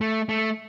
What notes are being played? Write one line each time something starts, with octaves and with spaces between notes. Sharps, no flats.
A3
A3